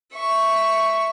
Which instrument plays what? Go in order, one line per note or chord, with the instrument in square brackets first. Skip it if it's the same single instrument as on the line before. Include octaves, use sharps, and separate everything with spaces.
[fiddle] E5 C#6